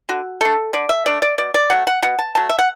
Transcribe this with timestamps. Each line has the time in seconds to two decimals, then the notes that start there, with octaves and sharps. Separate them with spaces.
0.09 D3 F#4
0.41 A3 D4 A4
0.73 D3 D5
0.89 E5
1.06 A3 D4 D5
1.22 D5
1.38 B2 D5
1.54 D5
1.70 F#3 A3 F#5
1.87 F#5
2.02 B2 F#5
2.19 A5
2.35 F#3 A3 A5
2.49 E5
2.59 F#5